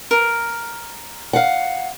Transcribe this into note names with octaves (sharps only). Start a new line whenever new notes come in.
A#4
F5 F#5